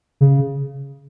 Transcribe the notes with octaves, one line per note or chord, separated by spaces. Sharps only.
C#3